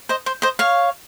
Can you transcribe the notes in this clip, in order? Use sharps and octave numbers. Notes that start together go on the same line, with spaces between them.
C5 D#5
C5
C5 D#5
C#5 F5